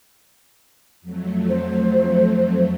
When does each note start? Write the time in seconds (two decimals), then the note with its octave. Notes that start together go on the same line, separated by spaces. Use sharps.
1.01 F2 F#3 A3
1.49 C5